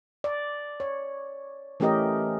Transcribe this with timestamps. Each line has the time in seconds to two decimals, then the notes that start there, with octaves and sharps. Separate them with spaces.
0.24 D5
0.80 C#5
1.80 E3 A3 C#4 G4 A#4 D#5